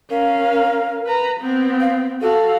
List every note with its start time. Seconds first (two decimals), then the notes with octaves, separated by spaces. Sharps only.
0.10 C#4 A#4 F5
1.06 B4 A#5
1.41 B3 C4
1.80 F5
2.21 F#4 A4 F5